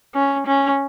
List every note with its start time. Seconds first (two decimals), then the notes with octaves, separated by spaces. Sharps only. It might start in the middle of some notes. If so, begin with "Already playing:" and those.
0.14 C#4
0.47 C#4